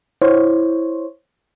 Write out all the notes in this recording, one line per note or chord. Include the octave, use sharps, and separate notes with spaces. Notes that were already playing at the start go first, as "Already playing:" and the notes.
E4 C5 C#5